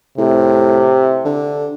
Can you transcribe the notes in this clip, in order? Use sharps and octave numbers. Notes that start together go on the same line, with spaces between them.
A2 C3
D3